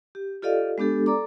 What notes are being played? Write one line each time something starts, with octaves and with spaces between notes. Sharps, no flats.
G4
F4 G4 A4 D5 D#5 F5
G#3 B3 D4 G4 A4
A4 D5 A#5 D6